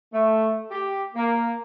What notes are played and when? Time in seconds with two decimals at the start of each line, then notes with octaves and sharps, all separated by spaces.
0.12 A3
0.70 G4
1.15 A#3